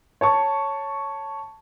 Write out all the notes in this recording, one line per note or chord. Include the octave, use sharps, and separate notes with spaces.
C#5 A5 C#6